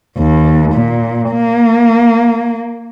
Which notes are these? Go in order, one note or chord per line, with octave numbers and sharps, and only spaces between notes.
D#2
A#2
A#3